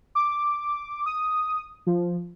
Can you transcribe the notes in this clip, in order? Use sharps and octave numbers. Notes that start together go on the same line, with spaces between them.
D6
D#6
F3